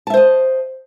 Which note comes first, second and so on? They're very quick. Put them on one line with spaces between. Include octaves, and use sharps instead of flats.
A5 E5 C5 D#5